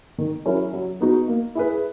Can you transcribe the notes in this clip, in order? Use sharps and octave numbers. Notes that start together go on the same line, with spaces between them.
D#3
F#3 C#4 E4 A#4
F#3
B3 D#4 F#4
A#3
E4 G#4 B4